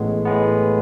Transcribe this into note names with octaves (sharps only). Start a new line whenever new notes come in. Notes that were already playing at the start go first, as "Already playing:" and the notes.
Already playing: A1 A2 G#3 B3
A2 G#3 B3